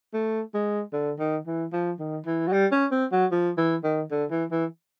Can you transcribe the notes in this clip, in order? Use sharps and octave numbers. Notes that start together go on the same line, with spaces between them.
A3
G#3
D3
D#3
E3
F3
D#3
E3
F#3
G3
C#4
C4
F#3
F3
E3
D#3
D3
E3
E3